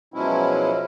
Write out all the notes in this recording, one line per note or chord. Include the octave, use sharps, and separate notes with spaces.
B2 F3 F#3 G#3 C#4 E4